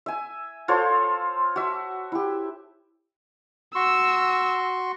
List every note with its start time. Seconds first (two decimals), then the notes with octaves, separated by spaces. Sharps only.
0.06 E5 G#5
0.68 F4 A4 C5 C#5
1.56 F#4 E5
2.12 E4 G4
3.75 F#4 C6 C#6 E6